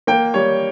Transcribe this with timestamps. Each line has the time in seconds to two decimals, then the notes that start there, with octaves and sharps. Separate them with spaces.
0.07 A#3 G5
0.34 G3 C#5